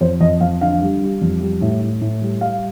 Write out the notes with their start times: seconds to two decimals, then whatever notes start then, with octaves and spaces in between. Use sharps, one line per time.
0.01 F2 C5
0.21 F2 D#5
0.41 F2 F5
0.61 D3 F5
0.82 G3
1.02 G3
1.21 F2
1.41 G3
1.61 A2
1.81 A2
2.01 A2
2.22 G3
2.41 G3 F5